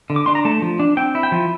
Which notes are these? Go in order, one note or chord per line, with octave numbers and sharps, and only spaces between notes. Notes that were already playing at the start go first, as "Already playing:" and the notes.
D3
D6
D4 C6
A#5
A3 A5
F3
D4
C4 G5
E4
G5
F3